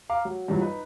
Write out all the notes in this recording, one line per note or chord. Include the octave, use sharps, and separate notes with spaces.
F5 A#5 D6
F#3
G2 A#2 E3 F#3
D#4 B4